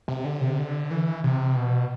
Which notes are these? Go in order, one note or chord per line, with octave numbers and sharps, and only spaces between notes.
C3
D3
C3
D3
E3
C3
B2